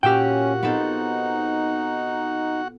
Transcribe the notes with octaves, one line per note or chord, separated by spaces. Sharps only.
A#2 C#4 F#4 G4 F#5 G5 E6 F6
B3 C4 D#4 A4